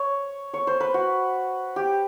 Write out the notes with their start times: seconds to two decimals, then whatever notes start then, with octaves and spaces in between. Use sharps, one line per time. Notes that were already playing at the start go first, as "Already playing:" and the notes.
Already playing: C#5
0.54 C#5
0.67 C5
0.80 B4
0.94 F#4
1.76 G4